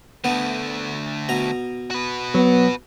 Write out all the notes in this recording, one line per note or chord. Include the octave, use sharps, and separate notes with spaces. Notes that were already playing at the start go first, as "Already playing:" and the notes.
D3 A3 B3
B2 A#5
F#4 B4
F#3 B3